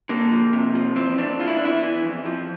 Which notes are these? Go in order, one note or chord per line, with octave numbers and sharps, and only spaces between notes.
D3 A#3
F3
C3
F3
E3 C4
A2 D4
E3 F4
E4
D4
E2 E4
E3
F2
F3